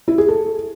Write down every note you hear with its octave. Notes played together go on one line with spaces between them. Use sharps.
E4
G#4
A4